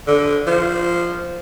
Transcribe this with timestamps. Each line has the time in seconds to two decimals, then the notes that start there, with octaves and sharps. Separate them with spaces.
0.07 D3
0.47 F3